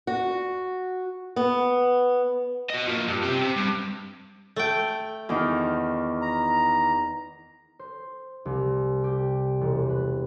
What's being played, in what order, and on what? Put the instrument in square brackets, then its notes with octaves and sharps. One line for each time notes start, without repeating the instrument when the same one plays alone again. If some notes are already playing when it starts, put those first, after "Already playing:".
[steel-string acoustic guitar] F#4
B3
[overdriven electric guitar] F#4 D#5
F3 A#3
G2
C4 G4
C3
G2
[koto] A3 G5
[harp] E2 D#3
[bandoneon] A#5
[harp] C5
C2
G4
E1
B4